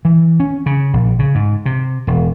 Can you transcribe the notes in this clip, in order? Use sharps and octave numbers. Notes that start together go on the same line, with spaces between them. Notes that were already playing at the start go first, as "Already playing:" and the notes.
E3
C#4
C#3
A#1
C#3
G#2
C3
E1